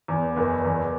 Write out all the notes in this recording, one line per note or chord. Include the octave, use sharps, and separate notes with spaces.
E2
B3
F#1
E2 B3